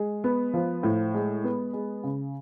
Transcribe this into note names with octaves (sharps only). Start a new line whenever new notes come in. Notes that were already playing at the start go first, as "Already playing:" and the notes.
Already playing: G#3
B3
F3
A2
G#3
B3
G#3
C#3